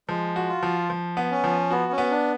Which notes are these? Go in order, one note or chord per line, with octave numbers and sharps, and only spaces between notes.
F3 G#3
F#4
F4
F3
F3
B3
C#4
F3
B3 F#4
C#4
B3
D4